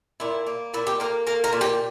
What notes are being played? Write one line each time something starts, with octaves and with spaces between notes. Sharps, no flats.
A#2 E4
A#3
A#2 E4
G4
A#3 A#4
A#3 A#4
A#4
A#2
G4